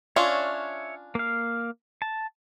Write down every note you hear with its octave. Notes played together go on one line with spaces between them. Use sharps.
C#4 D4 F4 C#5 E5
A#3 F5
A5